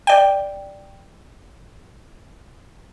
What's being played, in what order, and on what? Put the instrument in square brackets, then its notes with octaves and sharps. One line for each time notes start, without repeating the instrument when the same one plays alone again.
[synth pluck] D5 G5